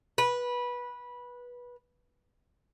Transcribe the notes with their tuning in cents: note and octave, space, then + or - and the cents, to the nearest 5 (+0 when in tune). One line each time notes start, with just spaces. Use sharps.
B4 -15